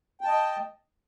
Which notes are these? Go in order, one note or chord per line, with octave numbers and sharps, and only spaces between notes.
D#5 G5 A5